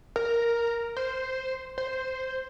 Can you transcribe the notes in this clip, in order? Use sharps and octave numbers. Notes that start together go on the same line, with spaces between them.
A#4
C5
C5